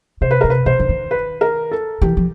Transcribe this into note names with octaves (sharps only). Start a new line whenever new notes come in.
C3 C5
B4
C3 A#4
B4
B2 C5
D3
D#3
B4
A#4
A4
E3 G4
F3